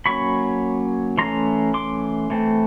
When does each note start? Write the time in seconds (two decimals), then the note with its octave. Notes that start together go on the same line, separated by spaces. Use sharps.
0.06 F#3 A#3 C#4 B5 C#6
1.18 E3 A3 C#4 A#5 C6
1.74 C6 D6
2.30 E3 A3 C4